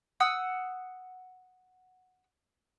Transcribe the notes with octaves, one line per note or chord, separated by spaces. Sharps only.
F#5 D#6 E6